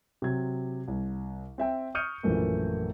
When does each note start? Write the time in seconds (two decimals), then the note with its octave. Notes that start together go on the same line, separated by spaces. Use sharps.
0.22 C3 F#3 G#6
0.88 C2
1.58 C4 E5 G5
1.95 C#6 D#6 F6 G6 C#7 D#7
2.23 A#1 F#2 E3 A3 A#3